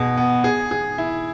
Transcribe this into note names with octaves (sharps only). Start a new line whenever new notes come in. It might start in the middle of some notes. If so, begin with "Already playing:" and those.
Already playing: B2 G#4
B3
G#4
G#4
E4